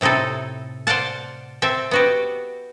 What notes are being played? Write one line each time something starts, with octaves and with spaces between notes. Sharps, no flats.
A2 C3 D#4 E4 A4
C5 D5 F5 F#5 A5
C4 A4 E5
B3 F#4 G4